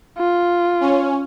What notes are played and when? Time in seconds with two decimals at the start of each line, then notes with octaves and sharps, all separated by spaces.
0.18 F4
0.80 C#4